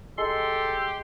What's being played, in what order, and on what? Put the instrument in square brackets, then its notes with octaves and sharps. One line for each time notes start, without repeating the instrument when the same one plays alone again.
[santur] G#3 [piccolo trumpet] G4 [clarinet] A4 [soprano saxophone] C6